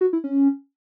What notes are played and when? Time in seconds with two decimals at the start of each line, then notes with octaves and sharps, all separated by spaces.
0.01 F#4
0.13 E4
0.24 C#4